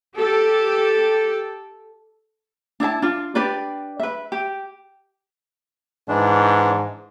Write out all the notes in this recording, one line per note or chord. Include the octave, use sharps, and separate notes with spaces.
G4 A4
D4 E4 E5 A5
D4 F4
D4 G4 B4 D5
B4 E5
G4
G#2 E3 D4